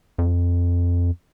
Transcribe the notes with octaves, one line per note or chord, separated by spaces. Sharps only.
F2